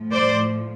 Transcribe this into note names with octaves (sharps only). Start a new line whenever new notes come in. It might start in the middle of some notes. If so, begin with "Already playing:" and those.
Already playing: A2 F3
C5 D5